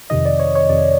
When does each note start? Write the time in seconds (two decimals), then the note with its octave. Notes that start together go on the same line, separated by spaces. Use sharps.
0.10 F2 C3 D#3 D#5
0.25 D5
0.39 C#5
0.55 C#5
0.69 F2 C3 D#3 D5